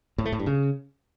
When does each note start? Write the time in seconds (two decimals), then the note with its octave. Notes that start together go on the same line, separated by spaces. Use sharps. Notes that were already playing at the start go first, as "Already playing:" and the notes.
0.18 A2
0.25 A3
0.32 A2
0.39 G2
0.46 C#3